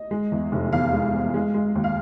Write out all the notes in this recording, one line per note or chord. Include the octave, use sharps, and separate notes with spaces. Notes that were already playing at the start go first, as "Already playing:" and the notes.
Already playing: D#5
G#3
E2
F1
E2 F5
G#3
F1
G#3
G#3
D#2
F5